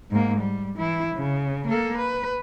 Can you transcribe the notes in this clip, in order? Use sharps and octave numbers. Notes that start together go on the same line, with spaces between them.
G#2 A#3
G3
E3 E4
C#3
A#3 A4
B4